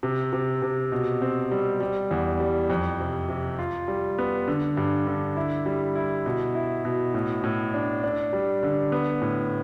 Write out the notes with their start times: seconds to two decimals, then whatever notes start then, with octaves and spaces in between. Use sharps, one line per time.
0.03 C3
0.33 C3
0.62 C3
0.92 B2
1.22 C4
1.51 G3
1.80 G3
2.11 E2
2.40 G3
2.70 F2
3.00 C3
3.28 C3
3.59 F4
3.88 G3
4.18 B3
4.48 D3
4.77 G2
5.07 D3
5.37 E4
5.66 G3
5.95 E4
6.26 B2
6.55 E4
6.85 B2
7.14 A2
7.44 A2
7.74 D4
8.03 D4
8.33 G3
8.63 D3
8.92 B3
9.21 A2